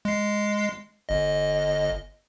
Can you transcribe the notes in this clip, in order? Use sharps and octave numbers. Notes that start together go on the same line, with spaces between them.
G#3 C7
G1 D#5